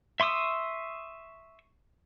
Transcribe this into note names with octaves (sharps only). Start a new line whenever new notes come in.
E5 C6 C#6 D#6 E6